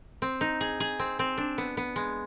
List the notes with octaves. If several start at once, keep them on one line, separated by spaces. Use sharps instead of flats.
C4
D#4
G#4
G#4
C4
C4
D4
B3
B3
G#3